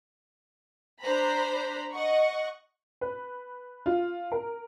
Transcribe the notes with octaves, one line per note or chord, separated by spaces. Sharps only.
D4 C5 A#5 B5
D#5 F#5 C#6
B4
F4
A#4